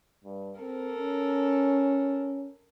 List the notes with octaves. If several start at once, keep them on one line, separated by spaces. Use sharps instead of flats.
G2
C4 A4 A#4
C#4